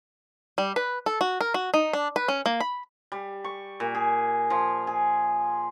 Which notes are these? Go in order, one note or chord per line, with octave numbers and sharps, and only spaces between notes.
G3
B4
A4
F#4
A#4
F#4
D#4
D4
B4
C#4
A#3
B5
G3
C#6
A#2
G#4
F3
G#4